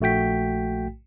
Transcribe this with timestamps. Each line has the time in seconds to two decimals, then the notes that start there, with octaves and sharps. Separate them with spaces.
0.01 A#1 A3 F#4 G5 B6